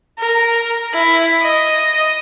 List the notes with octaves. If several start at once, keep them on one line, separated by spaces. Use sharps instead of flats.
A#4
E4
D#5